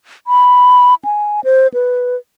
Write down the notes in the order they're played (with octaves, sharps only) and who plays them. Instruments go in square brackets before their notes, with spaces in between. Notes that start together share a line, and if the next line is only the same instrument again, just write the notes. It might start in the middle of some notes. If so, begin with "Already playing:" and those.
[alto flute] B5
G#5
C5
B4